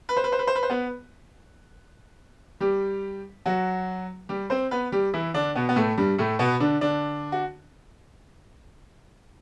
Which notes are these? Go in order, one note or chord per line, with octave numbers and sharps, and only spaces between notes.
B4
C5
B4
C5
B4
C5
B4
C5
B3 B4
G3 G4
F#3 F#4
G3 G4
C4 C5
B3 B4
G3 G4
E3 E4
D3 D4
B2 B3
B3
A2 A3
G2 G3
A2 A3
B2 B3
D3 D4
D3 D4
F#4